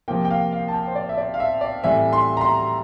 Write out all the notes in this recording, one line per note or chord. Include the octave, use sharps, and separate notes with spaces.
C3 F3 A#3 G5
G5
F5
F5
A5
G5
C5
D5
E5
D5
F5
E5
D5
A2 E3 G3 C4 E5
C6
A#5
C6